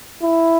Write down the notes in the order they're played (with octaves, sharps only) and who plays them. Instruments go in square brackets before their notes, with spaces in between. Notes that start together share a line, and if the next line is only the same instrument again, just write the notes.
[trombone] E4